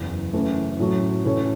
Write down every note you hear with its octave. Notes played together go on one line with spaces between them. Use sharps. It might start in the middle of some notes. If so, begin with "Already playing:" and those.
Already playing: F#1 E2 E3
F#1 F#2 E3 A3
A2 F#3 A3 C#4 F#4
A2 E3 C#4 A4 C#5